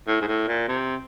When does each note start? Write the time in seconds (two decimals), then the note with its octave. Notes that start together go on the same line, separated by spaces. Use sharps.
0.07 A2
0.21 G#2
0.27 A2
0.47 A#2
0.68 C3